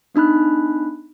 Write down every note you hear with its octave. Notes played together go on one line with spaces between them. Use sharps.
B3 D4 D#4 B5 F#6